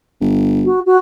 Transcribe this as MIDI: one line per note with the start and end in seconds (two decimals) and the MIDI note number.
0.21 0.69 31
0.65 0.80 66
0.86 0.97 66